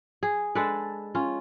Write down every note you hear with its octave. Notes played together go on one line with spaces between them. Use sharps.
G#4
G#3 D4 A4 B4
C#4 F4